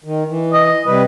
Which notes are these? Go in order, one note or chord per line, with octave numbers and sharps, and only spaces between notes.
D#3
E3
D#5
C3 G3 B4